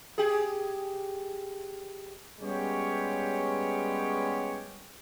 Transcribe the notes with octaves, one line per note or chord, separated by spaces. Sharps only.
G4 G#4
G3 G#3 B3 C#4 G4 C#5